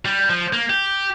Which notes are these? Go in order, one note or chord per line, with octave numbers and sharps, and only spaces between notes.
G3
F3
A#3
G4